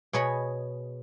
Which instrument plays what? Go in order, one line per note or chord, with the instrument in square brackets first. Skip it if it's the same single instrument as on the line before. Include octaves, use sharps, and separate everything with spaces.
[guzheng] B2 G#4 C#5 D#5 G#5 B5